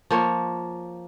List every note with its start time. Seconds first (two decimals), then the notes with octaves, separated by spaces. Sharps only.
0.10 F3 A#3 C#5